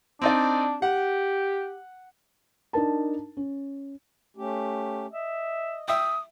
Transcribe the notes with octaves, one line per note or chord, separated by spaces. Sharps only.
C4 D4 D#4 D5
G4 F#5
D4 D#4 A#4 A5
C#4
A3 C#4 G4
D#5 E5
E5 G5 D#6